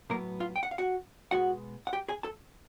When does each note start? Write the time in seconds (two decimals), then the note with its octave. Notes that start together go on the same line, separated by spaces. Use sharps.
0.10 A2 F#3 A#3 B3 A#4
0.40 F4 F5
0.56 G5
0.63 F#5
0.71 F5
0.78 F#4 F#5
1.31 B2 G#3 B3 F#4 F#5
1.87 F#5
1.93 G4 G5
2.08 G#4 G#5
2.23 A4 A5